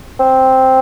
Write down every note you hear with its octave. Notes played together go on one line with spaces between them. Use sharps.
C4